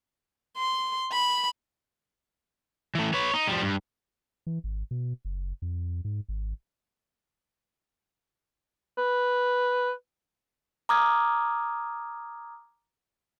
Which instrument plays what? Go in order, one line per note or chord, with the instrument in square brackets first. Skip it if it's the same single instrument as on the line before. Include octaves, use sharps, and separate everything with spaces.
[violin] C6
B5
[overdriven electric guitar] E3 A3
B4 C#5
D#4
F3 G3
G2
[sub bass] E3
G#1
B2
F#1
F2
G#2
G#1
[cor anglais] B4
[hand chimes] A#5 D6 D#6 F6 G#6